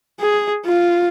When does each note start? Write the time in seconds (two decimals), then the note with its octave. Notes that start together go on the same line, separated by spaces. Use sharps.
0.20 G#4
0.65 F4